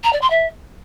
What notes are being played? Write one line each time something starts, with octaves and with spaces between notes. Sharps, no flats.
A#5
D5
C6
E5